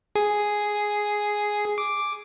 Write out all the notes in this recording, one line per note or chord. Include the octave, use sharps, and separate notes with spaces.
G#4
D6